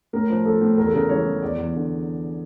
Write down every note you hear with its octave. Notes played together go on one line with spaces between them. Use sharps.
A2 A#4
F3
F3 A4
A2
E2 A#4
A4
C#3 A#4
E3 C#5
E3
E2 D5
E2
D3